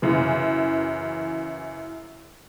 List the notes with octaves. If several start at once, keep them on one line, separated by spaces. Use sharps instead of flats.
F#2 C#3 E3